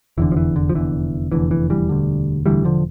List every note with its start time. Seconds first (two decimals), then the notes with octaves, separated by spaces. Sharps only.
0.17 F1 E2 D3 E3
0.32 F3
0.37 E3
0.56 D3
0.70 F3
0.75 F1 E2 D3 E3
1.32 F1 E2 D3 E3
1.51 E3
1.70 E3 G3
1.89 E1 D2 D3
2.46 E1 D2 D3 E3 G3
2.65 D3 F3